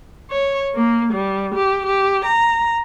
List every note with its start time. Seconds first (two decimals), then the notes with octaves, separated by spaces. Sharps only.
0.31 C#5
0.75 A#3
1.13 G3
1.55 G4
1.86 G4
2.25 A#5